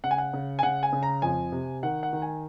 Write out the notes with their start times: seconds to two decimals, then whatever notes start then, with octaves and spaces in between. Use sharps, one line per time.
0.04 C#3 F#5
0.11 G#5
0.18 F#5
0.33 C#3
0.59 G#5
0.63 C#3 F#5
0.83 G#5
0.93 C#3
1.03 A#5
1.22 F2 G#5
1.52 C3
1.83 D#3 F#5
2.03 F#5
2.13 D#3
2.22 G#5